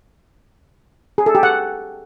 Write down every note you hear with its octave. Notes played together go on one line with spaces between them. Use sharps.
G#4
A4
G4
F#5